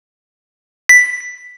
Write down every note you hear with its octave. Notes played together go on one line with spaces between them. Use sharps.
B6